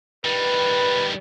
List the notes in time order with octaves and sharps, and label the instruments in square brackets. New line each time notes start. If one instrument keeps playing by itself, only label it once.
[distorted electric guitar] D#3 G3 [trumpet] B4